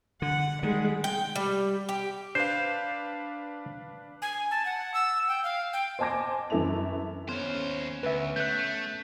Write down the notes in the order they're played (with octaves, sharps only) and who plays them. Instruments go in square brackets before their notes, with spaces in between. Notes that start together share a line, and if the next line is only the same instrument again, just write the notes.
[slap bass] D3 [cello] F#5
[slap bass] D#3 [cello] G3 [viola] G#3
[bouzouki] G5
G3
G4
[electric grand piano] D4 B4 F5 [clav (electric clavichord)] C5
[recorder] G#5
A5
F#5
E6
G5
F5
G5
[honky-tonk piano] C5 D#5 G#5 A5 D6 A#6
F#2 E3 E4 A4 E5 F7
[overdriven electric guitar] D#2 C5 [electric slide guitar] B3 C#4 C#5
[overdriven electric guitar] D2 [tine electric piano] B4 E5
[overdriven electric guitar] A3 [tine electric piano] F#6 G6